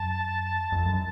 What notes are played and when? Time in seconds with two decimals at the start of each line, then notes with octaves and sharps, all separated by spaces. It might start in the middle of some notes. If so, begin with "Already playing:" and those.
Already playing: F#2 A5
0.72 F2
0.86 F#2